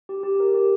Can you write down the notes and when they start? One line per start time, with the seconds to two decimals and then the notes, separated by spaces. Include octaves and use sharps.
0.09 G4
0.23 G4
0.40 A#4
0.54 G4